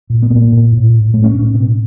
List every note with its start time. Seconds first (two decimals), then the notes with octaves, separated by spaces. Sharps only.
0.10 A#2
0.22 B3
0.30 A#2 A#3
0.52 A#2
0.72 A2
0.94 A2
1.14 A2 A3
1.24 C#4
1.34 A2 D4
1.45 C#4
1.54 B2 C4